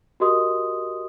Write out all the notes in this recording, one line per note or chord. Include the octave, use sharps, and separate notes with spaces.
F#4 G4 A#4 D#5 C6 D#6